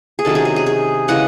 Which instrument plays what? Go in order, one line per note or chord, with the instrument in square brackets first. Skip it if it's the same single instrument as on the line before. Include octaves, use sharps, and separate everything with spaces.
[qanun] G#4
C3 D#3 F#3 C#4 A4
G#4
G#4
G#4
G#4
C#3 E3 G#3 F#5